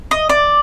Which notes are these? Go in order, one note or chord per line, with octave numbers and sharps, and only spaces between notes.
D#5
D5